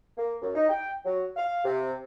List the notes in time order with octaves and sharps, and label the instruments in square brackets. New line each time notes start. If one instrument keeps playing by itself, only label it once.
[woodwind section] A#3
F#2
D#4
G5
F#3
F5
C3